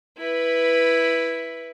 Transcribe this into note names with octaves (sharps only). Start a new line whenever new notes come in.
E4 B4